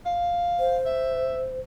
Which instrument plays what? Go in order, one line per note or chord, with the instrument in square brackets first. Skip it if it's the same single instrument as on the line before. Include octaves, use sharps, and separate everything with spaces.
[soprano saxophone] F5
[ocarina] C5
[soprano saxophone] E5